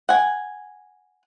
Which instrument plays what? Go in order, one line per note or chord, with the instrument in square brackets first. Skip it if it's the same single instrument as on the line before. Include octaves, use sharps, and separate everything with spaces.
[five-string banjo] F#5 G#5